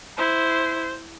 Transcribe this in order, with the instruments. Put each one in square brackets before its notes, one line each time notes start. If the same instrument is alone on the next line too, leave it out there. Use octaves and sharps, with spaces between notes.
[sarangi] E4 [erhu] C5